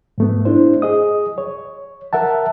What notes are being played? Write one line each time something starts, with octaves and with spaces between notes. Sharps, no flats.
G#2 A3 B3
D4 E4 C5
G#4 D#5 D#6
C#5
A#4 E5 F#5 A5